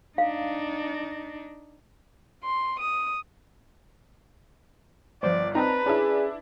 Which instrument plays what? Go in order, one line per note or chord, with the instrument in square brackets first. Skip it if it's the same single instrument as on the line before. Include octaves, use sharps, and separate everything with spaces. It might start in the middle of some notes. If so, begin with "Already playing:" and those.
[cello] D4 D#4 [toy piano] F5
[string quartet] C6
D#6
[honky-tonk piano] G1 [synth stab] F3 C5 [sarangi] D5
[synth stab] C4 D#4 [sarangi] B4 [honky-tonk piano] A5 A#5
[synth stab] C#4 [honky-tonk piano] D4 E4 [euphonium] G#4